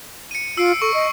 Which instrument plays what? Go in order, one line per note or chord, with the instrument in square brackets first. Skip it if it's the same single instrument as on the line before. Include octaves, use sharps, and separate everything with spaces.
[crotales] C#7 D#7
[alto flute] F4 [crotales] E6 C7 D7
[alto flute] A4 [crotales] C#6
[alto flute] D#5